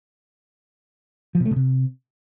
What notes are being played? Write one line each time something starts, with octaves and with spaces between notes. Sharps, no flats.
F3
B2
A3
B2
C3